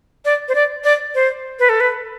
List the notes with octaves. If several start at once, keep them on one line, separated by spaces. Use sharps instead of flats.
D5
C5
D5
D5
C5
B4
A4
B4